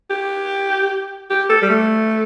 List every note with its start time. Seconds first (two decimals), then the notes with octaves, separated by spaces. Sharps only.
0.10 G4
1.30 G4
1.50 A4
1.62 G3
1.70 A3